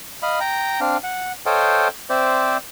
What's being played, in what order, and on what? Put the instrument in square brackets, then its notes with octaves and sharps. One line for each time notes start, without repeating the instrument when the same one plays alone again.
[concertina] D#5 F5 B5
G5 A#5
C4 D4 F5
F#5
A4 C5 C#5 D#5 F5 G5
C4 C5 D5 E5